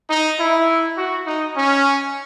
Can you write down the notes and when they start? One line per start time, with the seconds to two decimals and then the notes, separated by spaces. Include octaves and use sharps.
0.09 D#4
0.38 E4
0.96 F#4
1.26 D#4
1.56 C#4